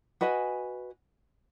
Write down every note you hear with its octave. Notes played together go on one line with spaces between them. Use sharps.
F#4 B4 D#5 G#5